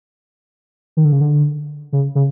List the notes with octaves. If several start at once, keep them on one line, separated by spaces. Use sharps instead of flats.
D#3
D3
C#3
D3
C#3
C#3